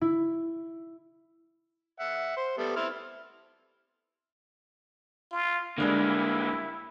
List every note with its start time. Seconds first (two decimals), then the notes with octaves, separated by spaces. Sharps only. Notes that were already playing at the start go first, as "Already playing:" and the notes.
0.01 E4
2.00 E5 F#5
2.37 C5 C6
2.58 G3 A3 B3
2.76 C4 E4 F6
5.31 F4
5.78 D3 G3 G#3 A#3 D4 E4